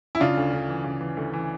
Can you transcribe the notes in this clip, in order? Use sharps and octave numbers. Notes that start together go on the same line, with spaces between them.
E4
C#3 D4 F4
D2
D2
E3
C#3
E3
D2
E3